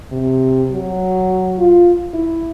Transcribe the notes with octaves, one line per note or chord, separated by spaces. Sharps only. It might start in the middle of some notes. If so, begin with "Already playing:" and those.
C3
F#3
F4
E4